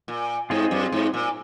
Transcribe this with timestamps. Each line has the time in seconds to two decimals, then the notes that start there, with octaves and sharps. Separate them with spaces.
0.08 A#2
0.50 G#2 C4 F4 G#4 C5 D#5
0.71 F#2
0.92 G#2
1.14 A#2